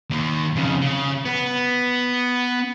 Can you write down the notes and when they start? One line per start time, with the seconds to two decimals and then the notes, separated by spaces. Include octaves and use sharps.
0.10 D#2 D#3
0.56 F2 C#3
0.82 C#3
1.26 B3